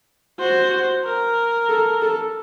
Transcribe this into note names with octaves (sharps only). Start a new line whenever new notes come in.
F#4 C5
A#4
A4
A4